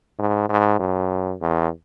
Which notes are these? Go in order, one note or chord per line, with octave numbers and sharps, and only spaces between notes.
G#2
G#2
F#2
E2